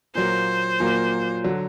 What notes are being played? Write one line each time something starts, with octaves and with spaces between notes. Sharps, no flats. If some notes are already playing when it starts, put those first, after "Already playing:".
A#2 F#3 A#3 C5
A#2 F#3 A#3
D3 F#3